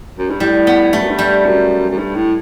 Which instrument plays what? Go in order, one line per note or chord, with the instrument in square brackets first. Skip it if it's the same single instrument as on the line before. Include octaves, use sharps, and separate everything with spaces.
[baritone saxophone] F#2
G2
[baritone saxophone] A2 [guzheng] G3
[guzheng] B3
[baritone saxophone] G2 [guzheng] A3
[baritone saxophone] F#2
G2
[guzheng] G3
[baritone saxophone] F#2
F#2
G2
A2